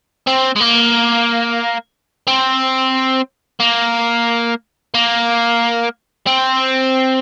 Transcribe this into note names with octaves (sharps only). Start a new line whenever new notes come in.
C4
G#3
A#3
C4
A#3
A#3
C4